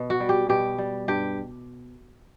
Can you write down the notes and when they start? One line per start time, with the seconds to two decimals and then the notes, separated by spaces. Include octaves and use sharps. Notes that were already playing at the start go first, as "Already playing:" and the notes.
Already playing: B2
0.10 F#4
0.20 G3
0.29 G4
0.49 B2 G4
0.78 G3
1.08 G2 G4